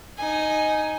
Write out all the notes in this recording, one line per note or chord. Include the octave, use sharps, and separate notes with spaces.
D#4 G#5